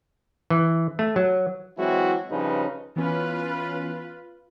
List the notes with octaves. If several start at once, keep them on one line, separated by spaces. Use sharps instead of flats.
E3
A3
F#3
E3 F#3 G#3 C4 E4 F#4
G2 C#3 F3 C#4 D#4 B4
E3 B3 C#4 F4 B4